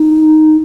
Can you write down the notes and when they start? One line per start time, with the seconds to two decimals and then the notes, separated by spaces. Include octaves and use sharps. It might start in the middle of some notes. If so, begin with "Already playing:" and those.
Already playing: D#4